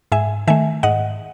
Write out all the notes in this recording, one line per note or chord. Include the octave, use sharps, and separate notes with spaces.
G#2 E5 G#5
D#3 A3 E5 G#5
G#2 D#5 F#5